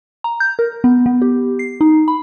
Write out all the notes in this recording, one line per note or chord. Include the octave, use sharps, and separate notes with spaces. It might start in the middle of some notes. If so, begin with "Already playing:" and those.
A#5
G6
A#4
B3
B3
G4
C7
D#4
B5